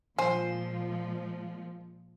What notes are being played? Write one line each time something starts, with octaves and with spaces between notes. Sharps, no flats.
A#2 F3 G#3 C5 G#5